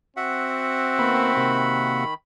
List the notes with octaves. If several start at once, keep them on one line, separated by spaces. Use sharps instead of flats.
C4 F#4 E5 F#5
D#3 A#3 B3 B5
C3 A#3